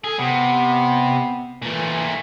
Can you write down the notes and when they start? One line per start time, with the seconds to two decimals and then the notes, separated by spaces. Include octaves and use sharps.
0.04 G#4 A4
0.19 C3 B3
1.62 A#2 E3 A3